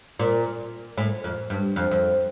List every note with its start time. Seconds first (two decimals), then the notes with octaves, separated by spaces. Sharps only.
0.19 A#2
0.97 A2
1.24 F2
1.50 G2
1.76 F2
1.91 F2